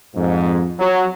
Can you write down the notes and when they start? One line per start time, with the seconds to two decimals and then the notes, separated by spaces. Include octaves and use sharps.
0.15 F2 G#2
0.79 F#3